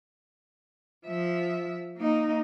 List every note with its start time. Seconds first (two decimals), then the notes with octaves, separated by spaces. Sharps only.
1.06 F3 E5
1.97 A#3 D#4